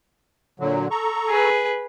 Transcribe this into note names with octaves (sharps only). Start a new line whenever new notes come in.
A#2 D3 F#3
A4 A#5 C#6
G#4 B4